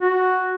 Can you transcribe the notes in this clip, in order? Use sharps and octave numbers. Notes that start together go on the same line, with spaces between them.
F#4